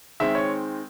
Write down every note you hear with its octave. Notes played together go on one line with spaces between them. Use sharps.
D#3 G#3 C4 E5
C#5